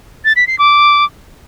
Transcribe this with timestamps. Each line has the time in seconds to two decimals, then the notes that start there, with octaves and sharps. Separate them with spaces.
0.25 A6
0.36 B6
0.47 C7
0.59 D6